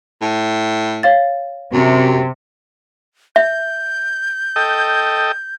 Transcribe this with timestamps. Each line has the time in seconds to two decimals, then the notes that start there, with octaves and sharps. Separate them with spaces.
0.22 A2
1.03 C#5 F5 A6
1.73 F#2 C3
3.36 E5 G6
4.56 A4 D#5 G5